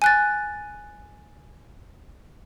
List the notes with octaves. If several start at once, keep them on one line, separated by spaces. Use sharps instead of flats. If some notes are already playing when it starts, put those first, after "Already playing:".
G#5 F#6 A6